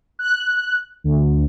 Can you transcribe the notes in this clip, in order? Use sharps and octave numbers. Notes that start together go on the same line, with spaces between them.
F#6
D2